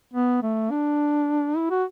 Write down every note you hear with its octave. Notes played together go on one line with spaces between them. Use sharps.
B3
A3
D4
E4
F#4